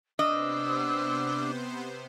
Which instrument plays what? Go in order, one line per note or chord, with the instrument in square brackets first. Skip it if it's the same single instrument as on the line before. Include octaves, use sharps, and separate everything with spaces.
[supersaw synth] C3 B3 C5 [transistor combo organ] D4 [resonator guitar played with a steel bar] D#5 [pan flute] E6